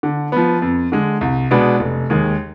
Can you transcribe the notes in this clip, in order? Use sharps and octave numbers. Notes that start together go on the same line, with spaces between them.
D3
F3 B3
F2
D3 G#3
C2
B2 G#3 B3 D4
F1
D#2 D#3 G#3